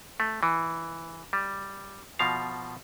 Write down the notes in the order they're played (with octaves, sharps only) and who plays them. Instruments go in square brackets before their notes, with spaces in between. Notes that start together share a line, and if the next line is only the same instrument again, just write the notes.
[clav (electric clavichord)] A3
E3
G3
B2 F3 F5